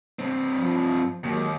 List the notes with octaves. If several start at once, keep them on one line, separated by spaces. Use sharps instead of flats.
G2 C4
F3
D#2 F#3 G#3 A#3